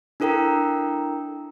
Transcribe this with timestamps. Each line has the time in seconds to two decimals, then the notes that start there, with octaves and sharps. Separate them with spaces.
0.20 D4 E4 A4 A#4 G5 A#5